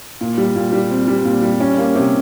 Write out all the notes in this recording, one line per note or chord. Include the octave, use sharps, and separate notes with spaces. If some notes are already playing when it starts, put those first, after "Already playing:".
A#2
G3
A#2
G3
C4
G3
A#2
G3
C#4
A#3
C3